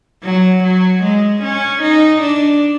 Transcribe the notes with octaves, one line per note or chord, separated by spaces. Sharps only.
F#3
F#3
G#3
C#4
D#4
D4